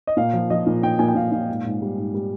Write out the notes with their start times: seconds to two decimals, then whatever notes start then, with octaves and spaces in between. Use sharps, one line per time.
0.07 D#5
0.17 A#2 F5
0.33 F3
0.50 F3 D#5
0.67 A#2
0.83 A#2 G5
0.99 A#2 G#5
1.08 G5
1.15 A#2 F5
1.32 A#2 F5
1.49 G#2
1.65 G#2
1.82 G3
1.98 G#2
2.14 G3